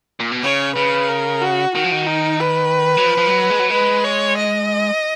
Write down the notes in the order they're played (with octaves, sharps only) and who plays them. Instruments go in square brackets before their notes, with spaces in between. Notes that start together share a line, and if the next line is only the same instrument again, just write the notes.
[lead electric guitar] A#2
B2
[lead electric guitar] C#3 [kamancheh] C#5
[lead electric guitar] C#3 [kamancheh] B4
[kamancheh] A#4
F#4
[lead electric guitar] D#3 [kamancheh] F#4
[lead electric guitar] F3
D#3
[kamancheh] D#4
B4
[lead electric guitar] F#3
F3
F3
F#3
G#3
F#3
[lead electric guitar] G#3 [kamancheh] B4
[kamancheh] C#5
D#5